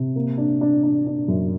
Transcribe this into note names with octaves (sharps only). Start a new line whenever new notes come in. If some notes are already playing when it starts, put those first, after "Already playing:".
Already playing: C3
A#3
D4
D4
D4
D4
F#2